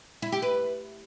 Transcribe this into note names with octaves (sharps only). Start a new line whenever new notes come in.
E4
G4
B4